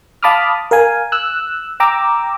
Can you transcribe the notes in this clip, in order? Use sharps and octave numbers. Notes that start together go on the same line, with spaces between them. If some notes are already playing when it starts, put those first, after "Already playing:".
F5 A5 B5 D6 D#6 F6
A#4 F5 G#5
E6 F#6
G5 A#5 D6 E6